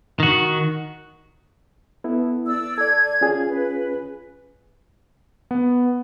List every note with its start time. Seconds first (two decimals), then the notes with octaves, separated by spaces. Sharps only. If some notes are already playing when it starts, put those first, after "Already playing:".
0.20 D#3 F#4
2.04 B3 E4 A4
2.46 D5 E6
2.78 A4 D5 G#6
3.21 C#4 F4 G#4
3.47 B4
5.51 B3